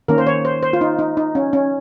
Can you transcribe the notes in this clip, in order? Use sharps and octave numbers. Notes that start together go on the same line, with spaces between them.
D#3 A#3 C#4 A#4
C5
C#5
C5
C5
F4
D#4
D#4
D#4
C#4
C#4